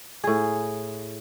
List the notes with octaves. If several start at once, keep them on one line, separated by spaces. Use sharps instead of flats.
A2 G#4